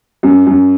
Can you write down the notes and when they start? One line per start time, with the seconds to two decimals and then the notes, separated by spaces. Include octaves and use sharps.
0.23 F#2
0.47 F#2